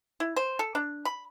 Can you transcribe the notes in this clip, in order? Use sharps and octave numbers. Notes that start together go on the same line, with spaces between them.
E4
C5
A4
D4
B5